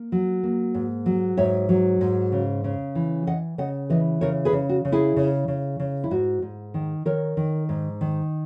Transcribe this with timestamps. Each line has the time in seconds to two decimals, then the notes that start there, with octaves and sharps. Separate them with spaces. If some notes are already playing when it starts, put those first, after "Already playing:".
Already playing: A#3
0.12 F#3
0.43 A#3
0.74 G#2
1.06 F#3
1.37 G#2 C#5 E5
1.69 F#3
2.01 G#2
2.32 C#3
2.64 C#3
2.95 E3
3.27 E3 D#5 F#5
3.58 C#3 D#5 F#5
3.90 E3 B4 D#5
4.21 C#3 A#4 C#5
4.45 G#4 B4
4.53 C#3
4.69 F#4
4.85 C#3
4.92 E4 G#4
5.16 C#3
5.48 C#3
5.80 C#3
6.04 E4
6.11 G#2 F#4
6.42 G#2
6.74 D#3
7.05 D#3 A#4 C#5
7.37 D#3
7.69 G#2
8.01 D#3